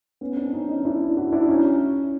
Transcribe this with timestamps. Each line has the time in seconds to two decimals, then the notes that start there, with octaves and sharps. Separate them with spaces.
0.21 B3 C#4
0.36 C4 D4
0.53 C#4 D#4
0.68 C#4 D#4
0.85 D4 E4
1.17 E4 F#4
1.32 D4 E4
1.48 C#4 D#4